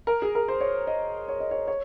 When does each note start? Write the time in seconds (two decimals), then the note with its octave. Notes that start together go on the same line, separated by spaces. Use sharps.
0.07 A#4
0.22 G#4
0.35 A#4
0.48 C5
0.61 C#5
0.87 D#5
1.28 C#5
1.40 D#5
1.51 C#5
1.68 C#5